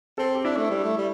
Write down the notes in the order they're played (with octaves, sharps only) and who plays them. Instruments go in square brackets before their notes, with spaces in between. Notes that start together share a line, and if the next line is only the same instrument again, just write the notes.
[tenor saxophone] C4 [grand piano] A4
[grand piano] G4
[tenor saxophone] D4 [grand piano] E4
[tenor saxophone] A3
G3
A3
G3